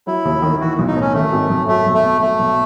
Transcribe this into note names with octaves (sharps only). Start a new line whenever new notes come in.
F#3 E4
D#2
D#3
E3 F#4
B1
D#4
A2 C#4
D#3 A3
G#1
F#2
F#3 A3
B1
A3
B2
F#3 A3
B1